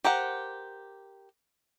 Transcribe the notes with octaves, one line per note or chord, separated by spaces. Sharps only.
G4 A#4 C5 F#5